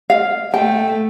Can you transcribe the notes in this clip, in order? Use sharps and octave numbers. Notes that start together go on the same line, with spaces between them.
F5
A3 G5